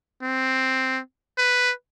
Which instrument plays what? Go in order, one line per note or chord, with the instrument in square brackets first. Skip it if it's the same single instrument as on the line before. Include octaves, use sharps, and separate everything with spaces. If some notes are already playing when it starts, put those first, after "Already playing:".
[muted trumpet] C4
B4